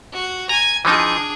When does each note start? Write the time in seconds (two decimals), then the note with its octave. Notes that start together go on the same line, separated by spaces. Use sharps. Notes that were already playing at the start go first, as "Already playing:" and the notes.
0.13 F#4
0.49 G#5 A#5
0.85 E3 F3 D4 D#4 G#4